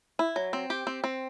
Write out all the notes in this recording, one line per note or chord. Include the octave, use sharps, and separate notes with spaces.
E4
F#3
C4
G4
C4
C4